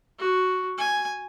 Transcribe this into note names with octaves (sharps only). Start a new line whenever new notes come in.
F#4
G#5